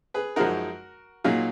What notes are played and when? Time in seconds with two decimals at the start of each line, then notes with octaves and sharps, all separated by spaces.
0.14 G#4 B4
0.36 F#2 F3 G#3 D#4 F#4 A#4
1.24 A#2 F#3 A#3 D#4 F4 G#4